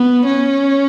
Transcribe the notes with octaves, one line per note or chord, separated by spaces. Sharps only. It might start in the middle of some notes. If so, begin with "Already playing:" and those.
Already playing: B3
C#4